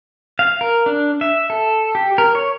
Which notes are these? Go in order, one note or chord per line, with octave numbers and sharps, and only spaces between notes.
F5
A#4
D4
E5
A4
G4
A#4
C#5